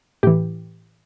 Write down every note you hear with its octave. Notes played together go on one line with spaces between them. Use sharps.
A2 E3 G4